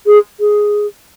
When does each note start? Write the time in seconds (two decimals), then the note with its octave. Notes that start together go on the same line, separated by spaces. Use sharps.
0.06 G#4
0.40 G#4